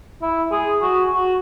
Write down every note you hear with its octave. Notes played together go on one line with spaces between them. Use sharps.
E4
G#4
F#4
F#4